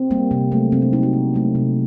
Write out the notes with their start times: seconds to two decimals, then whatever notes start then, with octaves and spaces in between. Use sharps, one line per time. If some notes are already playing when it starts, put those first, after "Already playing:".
Already playing: C4
0.11 G3 A#3
0.31 C3 A#3
0.52 F#3 A3
0.72 C3 C4
0.82 D4
0.93 F#3 A3 D#4
1.03 F#4
1.13 C3
1.34 F#3 A3
1.55 C3